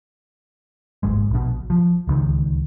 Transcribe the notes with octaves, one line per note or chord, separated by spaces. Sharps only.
D1 G#1 G#2 G#3
A#1 B2
F3
D1 C#2 D#3